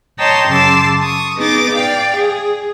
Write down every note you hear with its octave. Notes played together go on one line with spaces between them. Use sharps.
C#5 D#5 G5 A5 A#5 C6
F#2 C#3 A5 C6 D6 E6
C#6 D#6
B3 D#4 G#4 D6 A6
D5 F5 G5
G#4